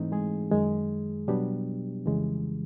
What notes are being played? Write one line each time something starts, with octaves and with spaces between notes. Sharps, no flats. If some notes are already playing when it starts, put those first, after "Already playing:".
Already playing: G#2 E3 A3 C4 D#4
G#3 G#4
F#2 D#3 G#3
B2 F#3 G3 B3 D4 G4
F2 C#3 E3 G#3